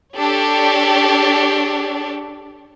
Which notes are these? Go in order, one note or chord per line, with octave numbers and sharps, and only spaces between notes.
D4 G4 A4 C#5